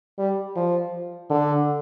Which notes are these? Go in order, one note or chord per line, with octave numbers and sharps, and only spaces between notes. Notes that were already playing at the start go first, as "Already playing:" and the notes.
G3
F3
D3